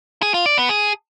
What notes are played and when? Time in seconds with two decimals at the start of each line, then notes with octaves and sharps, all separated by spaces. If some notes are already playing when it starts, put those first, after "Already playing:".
0.22 G#4
0.34 F4
0.46 D5
0.58 B3
0.69 G#4